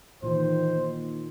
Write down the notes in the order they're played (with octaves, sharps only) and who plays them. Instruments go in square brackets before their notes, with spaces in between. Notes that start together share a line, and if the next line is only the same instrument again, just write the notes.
[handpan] A#2 D#3 [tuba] E3 [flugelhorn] C5
[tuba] A#3